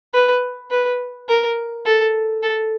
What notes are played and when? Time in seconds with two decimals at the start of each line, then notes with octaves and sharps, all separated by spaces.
0.14 B4
0.70 B4
1.28 A#4
1.85 A4
2.43 A4